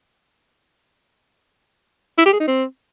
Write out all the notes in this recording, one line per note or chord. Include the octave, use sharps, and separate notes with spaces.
E4
G4
G#4
D#4
C4